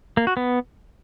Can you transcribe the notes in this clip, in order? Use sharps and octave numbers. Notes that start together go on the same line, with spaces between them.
A#3
F#4
B3